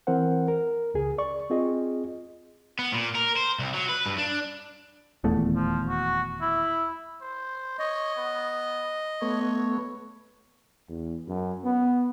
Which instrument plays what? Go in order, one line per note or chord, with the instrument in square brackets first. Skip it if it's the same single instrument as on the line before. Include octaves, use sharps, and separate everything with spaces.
[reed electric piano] E3 C4 A#4 C5 F#5
A#4
C#2 C#3 G#4
D5 C#6
C4 F4 G#4 D#5
[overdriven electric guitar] B3
A#2
A#4
C5
C2
F#3
B4
G2
D4
[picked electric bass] D#1 E2 A3
[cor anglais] F3
F#4
E4
[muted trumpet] C5
[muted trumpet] C#5 [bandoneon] D#5
[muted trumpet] B3
[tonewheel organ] A3 B3 [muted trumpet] C#5
[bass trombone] E2
F#2
B3